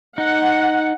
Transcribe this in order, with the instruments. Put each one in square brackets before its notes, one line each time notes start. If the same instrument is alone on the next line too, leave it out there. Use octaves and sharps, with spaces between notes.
[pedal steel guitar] D#4 [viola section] F#5